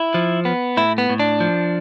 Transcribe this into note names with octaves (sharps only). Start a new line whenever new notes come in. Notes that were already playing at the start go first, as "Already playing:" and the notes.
Already playing: E4
F3
B3
A2 E4
B3
A2
D4
F3